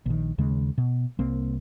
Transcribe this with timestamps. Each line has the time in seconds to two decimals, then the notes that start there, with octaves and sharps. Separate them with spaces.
0.06 A#1 D#3
0.38 D#2 C#3 G#3
0.78 B2
1.19 C2 A#3 C4